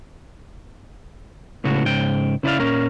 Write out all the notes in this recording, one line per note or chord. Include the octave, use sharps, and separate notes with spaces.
C#2 A2 C#3 F#4
G#2 C#3 G5
C#3 E4 B4 D5 F5
A#2 C#4 A#4